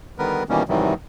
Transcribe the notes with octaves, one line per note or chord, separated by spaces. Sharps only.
D3 D#3 G3 B3 A#4 B4
B2 D#3 E3 G3 A#3 C#4
G#2 C3 D#3 E3 F#3 G3